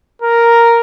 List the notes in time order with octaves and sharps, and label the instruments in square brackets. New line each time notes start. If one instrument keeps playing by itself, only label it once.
[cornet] A#4